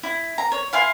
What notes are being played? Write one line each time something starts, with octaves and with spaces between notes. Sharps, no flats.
E4
A#5
C#5
E4 F5 G#5 C6